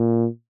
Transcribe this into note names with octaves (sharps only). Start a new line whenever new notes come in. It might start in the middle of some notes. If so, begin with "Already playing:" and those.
Already playing: A#2